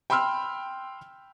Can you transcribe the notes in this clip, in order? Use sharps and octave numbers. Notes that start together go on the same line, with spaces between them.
G5 B5 C6 E6 F6